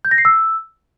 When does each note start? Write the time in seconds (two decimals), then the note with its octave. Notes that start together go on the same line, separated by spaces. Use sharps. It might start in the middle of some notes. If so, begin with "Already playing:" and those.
0.05 G6
0.11 A#6
0.18 C7
0.25 E6